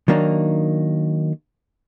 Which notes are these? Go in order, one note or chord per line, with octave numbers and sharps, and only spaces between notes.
D#3 F#3 A#3 D4 D#4